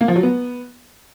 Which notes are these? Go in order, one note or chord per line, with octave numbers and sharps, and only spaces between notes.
A#3
F3
F#3
B3